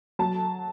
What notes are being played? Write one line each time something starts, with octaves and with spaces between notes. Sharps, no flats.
F#3 A5